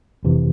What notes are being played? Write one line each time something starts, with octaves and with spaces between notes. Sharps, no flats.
G1 F2 C3 E3